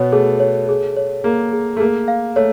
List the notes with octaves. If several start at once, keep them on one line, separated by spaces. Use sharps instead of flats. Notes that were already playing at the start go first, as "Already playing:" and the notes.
Already playing: B2 B3 C#5
A3 G#4
C#5
G#4
C#5
A#3 G#4
G#4
A3
A#3 G#4
F5
A3 C#5